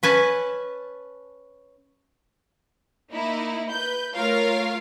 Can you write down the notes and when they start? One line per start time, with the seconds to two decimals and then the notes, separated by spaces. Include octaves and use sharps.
0.03 C#4 B4 G#5 A5
3.11 A#3 D#4 E4
3.71 B4 G6
4.16 A3 F4 A#4 C#5 F5